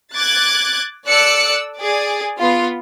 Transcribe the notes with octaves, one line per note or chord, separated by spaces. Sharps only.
D6 F#6 G#6 A6
A4 D5 E6 F#6 C#7
G#4 D5
B3 F4